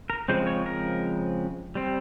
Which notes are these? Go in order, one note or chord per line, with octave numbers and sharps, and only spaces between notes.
A#4
C#3 F3 G#3 C4 C5
C#5
A#4
G3 C4